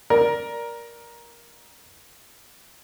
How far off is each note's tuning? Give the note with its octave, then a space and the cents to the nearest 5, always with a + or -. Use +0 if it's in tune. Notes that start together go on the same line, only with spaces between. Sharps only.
A#4 +15 D5 +0